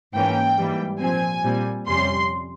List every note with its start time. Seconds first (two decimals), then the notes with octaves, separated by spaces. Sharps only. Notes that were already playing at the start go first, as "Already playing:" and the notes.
0.14 G#2 E3 A#3 C#4 G5
0.58 G#2 E3 G3 A#3
1.00 A#2 F3 C4 G#5
1.44 A#2 G3 C4
1.88 F2 C3 G3 C#4 C6